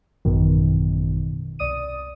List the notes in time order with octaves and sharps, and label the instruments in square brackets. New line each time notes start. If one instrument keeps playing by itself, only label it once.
[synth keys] A1 F#2 B2 D#3
C2 D5 D#6 D#7